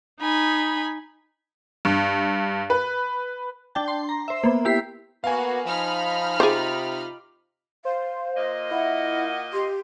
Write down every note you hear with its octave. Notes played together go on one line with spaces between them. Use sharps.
D#4 G#5 B5
G2
B4
D4 G5 A5
C6
A#5
C5 E5
A#3 B3
E4 G4 B6 C7
A#3 B3 F#4 F5 G#5
F3 D#4 B5 F6
C3 F4 G#4 C5 D6
C5 F5
A#2 A#3 D#5
E4 F#5
G4 C6